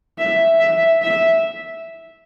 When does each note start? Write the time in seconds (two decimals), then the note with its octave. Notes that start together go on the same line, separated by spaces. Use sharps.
0.18 E5
0.60 E5
1.02 E5